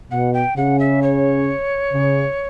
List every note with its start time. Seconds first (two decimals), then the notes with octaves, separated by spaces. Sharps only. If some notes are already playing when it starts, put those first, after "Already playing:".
0.11 B2 F#5
0.34 G5
0.57 C#3 F#5
0.79 E5
1.02 C#5
1.93 C#3